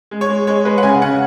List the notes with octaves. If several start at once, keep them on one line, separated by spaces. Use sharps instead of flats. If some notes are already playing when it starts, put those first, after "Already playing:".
G#3
C#5
G#3
G#3 C#5
G#3 B4
F#5
C#3 G#5
C#3 F#5